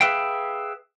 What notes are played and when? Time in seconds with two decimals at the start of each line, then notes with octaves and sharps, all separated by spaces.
0.01 G#4 B4 E5 F5 G5